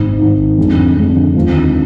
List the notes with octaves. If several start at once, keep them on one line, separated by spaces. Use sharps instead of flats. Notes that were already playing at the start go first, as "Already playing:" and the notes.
Already playing: G#1 G#2 D#3
G#1 G#2 D#3
F2 D3 G#3 D4
F2 D3 G#3 D4
D#2 D3 G#3 C4 F4